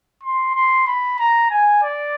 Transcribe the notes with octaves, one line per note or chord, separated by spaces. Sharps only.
C6
C6
B5
A#5
G#5
D5